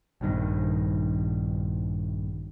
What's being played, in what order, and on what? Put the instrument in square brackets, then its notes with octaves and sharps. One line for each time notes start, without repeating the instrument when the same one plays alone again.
[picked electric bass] A#1 G2 D#3